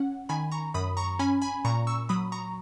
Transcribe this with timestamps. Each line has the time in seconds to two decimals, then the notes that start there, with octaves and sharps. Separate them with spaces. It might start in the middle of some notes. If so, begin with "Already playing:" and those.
Already playing: C#4 F#5
0.29 D#3 G#5 B5
0.52 A#5 C#6
0.74 F#2 B5 D#6
0.97 A#5 C#6
1.19 C#4 G#5 B5
1.42 G#5 B5
1.65 A#2 A#5 C#6
1.87 C#6 E6
2.09 F#3 B5 D#6
2.32 A#5 C#6